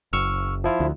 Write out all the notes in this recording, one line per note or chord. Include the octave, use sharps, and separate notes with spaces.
F#1 C#6 E6 F6
F3 E4 F4
D2